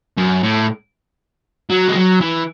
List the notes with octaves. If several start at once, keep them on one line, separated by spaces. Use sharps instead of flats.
F#2
A2
F#3
G#3
F#3
E3